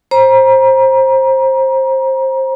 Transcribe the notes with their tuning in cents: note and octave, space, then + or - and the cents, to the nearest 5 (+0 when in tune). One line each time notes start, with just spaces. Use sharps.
C5 +20 A#5 +30